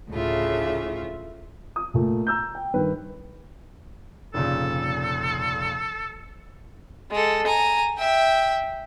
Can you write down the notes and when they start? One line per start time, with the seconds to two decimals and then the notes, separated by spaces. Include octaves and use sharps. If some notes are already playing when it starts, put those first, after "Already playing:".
0.10 D2 A2 C#3 F4 E5
1.76 D#6
1.94 A#2 A3
2.27 A#5 E6 G6
2.55 G5
2.74 G2 D#3 B4
4.34 F1 A#2 C#3 A4
7.11 G#3 A4
7.47 G#5 A#5
7.98 E5 G5